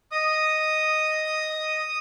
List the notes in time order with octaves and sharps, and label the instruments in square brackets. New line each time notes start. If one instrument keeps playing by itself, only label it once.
[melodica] D#5 [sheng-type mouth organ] D#6